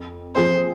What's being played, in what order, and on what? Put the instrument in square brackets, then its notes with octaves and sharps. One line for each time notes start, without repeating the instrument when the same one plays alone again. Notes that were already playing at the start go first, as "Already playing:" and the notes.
Already playing: [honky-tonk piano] F2
[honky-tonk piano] F3 C4 G#4 [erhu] C5